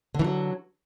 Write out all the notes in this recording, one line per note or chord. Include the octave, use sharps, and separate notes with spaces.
D3 E3 F#3